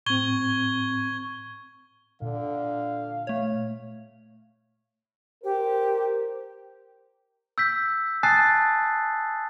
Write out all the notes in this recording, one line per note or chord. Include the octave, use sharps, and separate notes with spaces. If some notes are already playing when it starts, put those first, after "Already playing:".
A2 C4 C#6 G#6 G7
A#2 D3 F5
A3 C#5
G4 A#4 C5
E6 G6 B6
G#5 A5 D#6 F#6 A6 C7